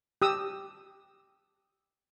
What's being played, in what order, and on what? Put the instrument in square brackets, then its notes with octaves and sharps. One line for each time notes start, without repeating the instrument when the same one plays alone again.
[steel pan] G4 D#6 E6